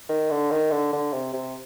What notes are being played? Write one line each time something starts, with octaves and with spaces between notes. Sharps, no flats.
D#3
D3
D#3
D3
D3
C3
C3